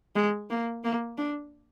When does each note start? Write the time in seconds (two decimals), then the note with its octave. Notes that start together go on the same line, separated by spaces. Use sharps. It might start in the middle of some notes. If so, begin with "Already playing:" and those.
0.15 G#3
0.50 A#3
0.84 A#3
1.18 D4